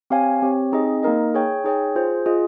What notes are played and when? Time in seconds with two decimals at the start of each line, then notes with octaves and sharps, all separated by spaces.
0.10 C4 G4 C#5 F5 G#5
0.42 C4 G4 C#5
0.73 C4 D#4 G#4 D#5
1.03 A#3 D#4 A#4 D#5
1.34 G#4 C#5 G5
1.64 D#4 G#4 C#5 G5
1.96 F4 G#4 C5
2.26 F4 G#4 D#5